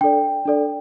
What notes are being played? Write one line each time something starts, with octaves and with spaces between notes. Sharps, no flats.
D4 A4 D5 G5
D4 A4 D5